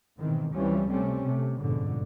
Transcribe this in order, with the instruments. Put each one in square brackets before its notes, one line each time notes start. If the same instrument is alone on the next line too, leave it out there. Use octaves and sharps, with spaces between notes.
[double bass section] G#2 B2 D#3 E3 C4
C#2 E3 F3 G3 C4 C#4
C3 G3 A3 C4 C#4
C3 A3
G1 F2 G#2 B2 D3